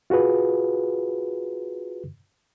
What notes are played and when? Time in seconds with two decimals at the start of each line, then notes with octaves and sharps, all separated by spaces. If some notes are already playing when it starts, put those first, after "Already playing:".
0.10 F4 F#4 G#4 B4